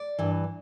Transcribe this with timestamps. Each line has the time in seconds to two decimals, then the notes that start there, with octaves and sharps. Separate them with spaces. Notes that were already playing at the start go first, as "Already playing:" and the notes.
Already playing: D5
0.19 G2 E3